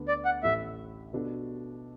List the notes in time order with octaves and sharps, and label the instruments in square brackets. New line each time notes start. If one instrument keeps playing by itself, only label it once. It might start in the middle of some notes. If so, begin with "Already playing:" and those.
Already playing: [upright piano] D2 D3 B3 D4
[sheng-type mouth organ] D5
F#5
[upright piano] A1 A2 A3 E4 [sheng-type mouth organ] E5
[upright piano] B2 B3 D4 F#4 A4